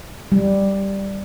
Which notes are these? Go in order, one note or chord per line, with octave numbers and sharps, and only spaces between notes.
G3